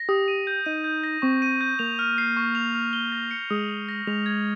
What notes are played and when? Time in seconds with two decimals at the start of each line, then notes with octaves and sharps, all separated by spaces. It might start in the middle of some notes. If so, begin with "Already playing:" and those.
Already playing: A#6
0.09 G4 D#6
0.28 D#7
0.47 G6
0.66 D#4 D#7
0.84 G6
1.04 A#6
1.22 C4 C#6
1.42 D#7
1.61 G6
1.79 A#3 F7
1.99 F6
2.18 C7
2.37 C#6
2.55 F7
2.75 F6
2.93 G7
3.12 A#6
3.31 C#7
3.50 G#3 D#6
3.69 G7
3.89 A#6
4.07 G#3 F7
4.26 G#6